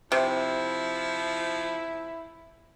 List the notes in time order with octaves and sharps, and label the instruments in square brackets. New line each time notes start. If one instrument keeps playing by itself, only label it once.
[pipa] C3 [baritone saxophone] F3 [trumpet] E4